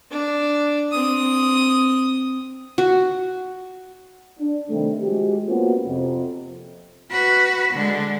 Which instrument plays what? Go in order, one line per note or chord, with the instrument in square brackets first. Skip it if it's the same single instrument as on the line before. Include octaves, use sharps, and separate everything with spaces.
[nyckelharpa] D4
C4 D#6
[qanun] F#4
[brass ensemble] D4
C3 D#3 G3 A3
F3 G#3 F#4 G4
A#3 B3 C#4 F4 F#4 C5
F2 C3
[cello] F#4 B4
D3 G#3